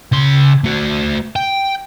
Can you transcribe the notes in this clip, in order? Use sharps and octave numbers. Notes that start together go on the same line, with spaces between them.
C#3 C6
A3 F#4
G5